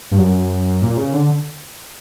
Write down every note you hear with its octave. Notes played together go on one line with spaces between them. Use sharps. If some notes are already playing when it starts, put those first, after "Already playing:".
G2
F#2
A#2
C#3
D3